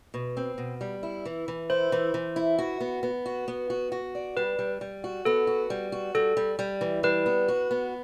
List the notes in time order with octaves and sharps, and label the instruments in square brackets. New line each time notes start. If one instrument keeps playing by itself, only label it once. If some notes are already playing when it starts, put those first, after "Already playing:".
[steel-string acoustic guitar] B2
C4
B2
G3
E4
E3
E3
[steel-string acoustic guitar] E4 [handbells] C5
[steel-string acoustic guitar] E3
E3
E4
F#4
B3
B3
F#4
B3
F#4
F#4
D5
[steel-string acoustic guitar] G3 [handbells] B4
[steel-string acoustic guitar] G3
G3
F#4
[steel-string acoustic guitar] B3 [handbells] A4
[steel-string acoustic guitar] F#4
G3
F#4
[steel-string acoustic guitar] G3 [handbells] A4
[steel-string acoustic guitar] G3
G3
E3
[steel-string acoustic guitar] G3 [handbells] B4
[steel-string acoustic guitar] B3
F#4
B3